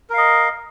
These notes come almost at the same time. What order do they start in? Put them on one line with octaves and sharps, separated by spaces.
A#4 F5 D#5